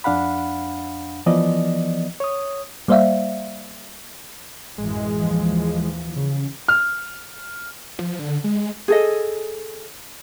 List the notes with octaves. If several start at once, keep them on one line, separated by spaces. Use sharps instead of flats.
F2 D4 F5 F#5 B5
E3 F3 B3 D5 D#5
C#5 D#6
G3 A#3 C5 D5 E5 F5
A1 F#2 E3 G#3
D#2 E3 F3
C#3
F6
F3
D3
G#3
G#4 A4 D#5